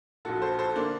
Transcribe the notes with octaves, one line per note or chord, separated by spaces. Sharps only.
A#1 A#2 F#4 A4
A4 C5
A4 C5
D3 A#3 D4